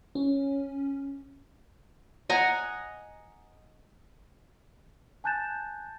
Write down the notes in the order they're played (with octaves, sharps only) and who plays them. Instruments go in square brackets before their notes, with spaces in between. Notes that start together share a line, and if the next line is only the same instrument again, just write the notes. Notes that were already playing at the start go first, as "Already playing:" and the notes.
[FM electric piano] C#4
[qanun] D#5 F#5 G#5 A#5
[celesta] G#5 A5 F#6 G6 A6 E7